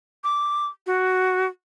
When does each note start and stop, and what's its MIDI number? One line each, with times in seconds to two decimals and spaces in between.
0.24 0.67 86
0.87 1.46 66